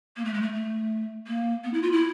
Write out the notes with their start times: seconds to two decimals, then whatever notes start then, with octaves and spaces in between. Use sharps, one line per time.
0.17 A#3
0.25 A3
0.34 G#3
0.42 A3
0.53 A3
1.27 A#3
1.64 B3
1.73 E4
1.83 F4
1.92 E4